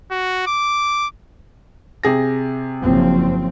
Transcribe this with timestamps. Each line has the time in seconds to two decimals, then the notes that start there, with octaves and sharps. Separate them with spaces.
0.11 F#4
0.47 D6
2.03 C3 G#4 A#6
2.82 F#1 F3 C4